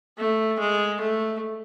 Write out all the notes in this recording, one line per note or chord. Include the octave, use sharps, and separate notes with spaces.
A3
G#3
A3